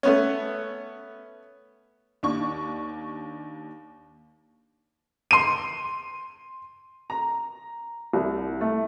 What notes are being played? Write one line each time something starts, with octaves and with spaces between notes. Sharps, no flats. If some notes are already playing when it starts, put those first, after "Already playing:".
A3 B3 C#4
D#2 D4 C#6
C6 D#7
A#5
C2
A3